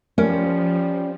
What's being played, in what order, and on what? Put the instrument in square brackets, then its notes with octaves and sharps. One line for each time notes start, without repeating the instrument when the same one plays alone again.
[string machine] F3 [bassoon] G3 [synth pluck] A3 A#4 [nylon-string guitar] C#4